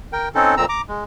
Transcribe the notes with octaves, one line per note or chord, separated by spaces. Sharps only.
A#4 G5
C4 C#4 D#4 A4
F2 A#2 C4 A#5 E6
A#5 D6
G#3